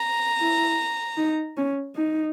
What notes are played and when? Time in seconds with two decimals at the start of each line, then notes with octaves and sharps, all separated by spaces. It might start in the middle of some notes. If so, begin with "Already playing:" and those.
Already playing: A#5
0.40 E4
1.18 D#4
1.57 C#4
1.96 D#4